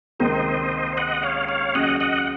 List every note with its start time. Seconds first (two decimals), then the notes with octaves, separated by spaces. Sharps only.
0.19 C#2 C3 D#3 A#3 C5 D#5
0.97 D#5 F#5
1.23 C#5 F5
1.49 C#5 F5
1.75 D#2 C#3 F#3 C#4 D#5 F#5
2.00 D#5 F#5